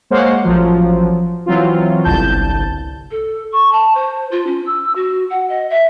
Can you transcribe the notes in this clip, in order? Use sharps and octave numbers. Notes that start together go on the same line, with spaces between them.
G#3 A#3 C5 C#5 F5 F#5
A1 F3 F#3
E3 F#3 C4 F4
G1 C2 A5 G6
A4
C#6
A5
C5
F4
C#4
E6
F#4
F#5
D#5
E5